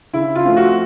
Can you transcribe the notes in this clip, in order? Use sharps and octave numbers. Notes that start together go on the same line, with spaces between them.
C#3 E4
F4
F3 A3 C4
F#4